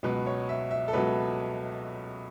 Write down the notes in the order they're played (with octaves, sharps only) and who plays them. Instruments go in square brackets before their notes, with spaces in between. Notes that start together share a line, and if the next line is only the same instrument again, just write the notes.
[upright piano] C#2 B2 F#3 B4
C#5
E5
E5
A4
C#2 B2 F#3 B4